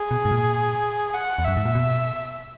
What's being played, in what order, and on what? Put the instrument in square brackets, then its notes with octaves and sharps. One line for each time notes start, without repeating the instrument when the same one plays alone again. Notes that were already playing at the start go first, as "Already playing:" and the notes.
Already playing: [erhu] G#4
[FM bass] B2
G#2
A#2
[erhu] F#5
[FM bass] E2
[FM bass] F#2 [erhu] E5
[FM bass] G#2
A#2
B2